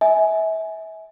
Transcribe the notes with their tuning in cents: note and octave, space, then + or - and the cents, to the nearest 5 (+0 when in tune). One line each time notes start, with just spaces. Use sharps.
E5 -30 G#5 +10